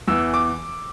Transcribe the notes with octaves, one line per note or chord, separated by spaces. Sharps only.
E2 E3 E6
D6